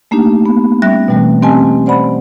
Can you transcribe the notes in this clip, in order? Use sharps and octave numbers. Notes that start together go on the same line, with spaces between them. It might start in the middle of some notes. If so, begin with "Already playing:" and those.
A3 A#3 D4 D#4 G4
B3
G3 C#4 E5 F#6 A#6
B2 E3 G3 A3 C4
C4 C#4 G4 D#5 G#5 A5
C5 D5 F#5 B5